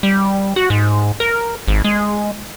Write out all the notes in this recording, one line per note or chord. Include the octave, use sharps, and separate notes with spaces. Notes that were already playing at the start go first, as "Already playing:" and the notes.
G3
F#4
G#2
A#4
G#1
G#3